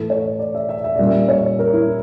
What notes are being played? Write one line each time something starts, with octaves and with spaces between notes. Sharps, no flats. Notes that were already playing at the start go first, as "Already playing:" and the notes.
Already playing: A2 E3 A3 A4
C#5
D5
E5
E5
E5
A#2 G3 C#4 D5
E5
C#5
A#4
E4